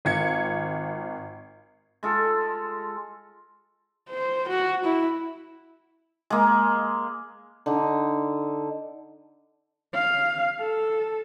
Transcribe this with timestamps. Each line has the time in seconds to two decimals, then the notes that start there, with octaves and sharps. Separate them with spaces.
0.05 G#1 F4 G#6 C#7
2.03 G#3 F4 A4
4.10 C5
4.49 F#4
4.85 E4
6.30 G#3 A#3
7.66 D3 D#4
9.94 F5
10.59 A4